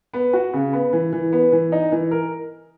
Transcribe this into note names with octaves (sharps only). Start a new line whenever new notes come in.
B3
F#4
C#3
B3
E3
E3
B3
E3
D#4
E3
A#4